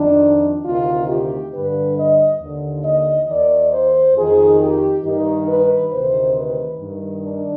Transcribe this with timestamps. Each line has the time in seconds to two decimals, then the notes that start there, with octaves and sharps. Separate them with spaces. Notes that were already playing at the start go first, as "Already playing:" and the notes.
Already playing: F2 D#3 D4
0.65 D2 C3 D#3 F4
1.08 G4
1.53 G2 D3 B4
1.97 D#5
2.41 D#2 D3
2.84 D#5
3.28 D#2 D#3 D5
3.72 C5
4.15 F2 D#3 G#4
4.60 G4
5.03 G2 D#3 D#4
5.47 B4
5.92 D2 C3 D#3 C5
6.36 B4
6.79 G2 D#3
7.23 D4